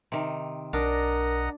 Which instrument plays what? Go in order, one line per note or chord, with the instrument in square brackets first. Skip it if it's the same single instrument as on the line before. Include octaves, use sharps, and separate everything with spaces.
[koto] C3 D#3
[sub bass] B1 [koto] D4 [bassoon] A#4 [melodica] D#5 F#5 A#5